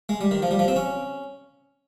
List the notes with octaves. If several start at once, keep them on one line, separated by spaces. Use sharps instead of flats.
G#3
G3
D#3
F3
G3
F3
C4
C#4